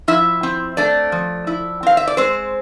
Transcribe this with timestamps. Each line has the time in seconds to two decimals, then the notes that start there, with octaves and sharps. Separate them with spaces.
0.08 F3 E4 E5
0.43 C4
0.77 A3 D4 D5
1.12 F3
1.47 E4
1.83 C4 F5
1.97 E5
2.07 D5
2.17 G#3 C4 C5